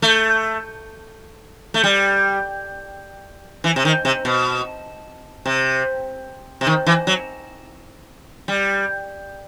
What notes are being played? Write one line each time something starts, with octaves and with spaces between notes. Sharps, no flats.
A3
A3
G3
E3
C3
D#3
C3
B2
C3
C3
D#3
E3
F#3
G3